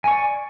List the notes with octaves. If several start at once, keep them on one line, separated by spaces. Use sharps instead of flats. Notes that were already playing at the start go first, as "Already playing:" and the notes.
D5 G#5 C#6